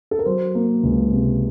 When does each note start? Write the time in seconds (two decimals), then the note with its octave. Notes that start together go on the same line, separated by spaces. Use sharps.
0.11 A4
0.19 A#4
0.26 F#3 C5
0.55 A#3
0.83 C#2
1.12 C3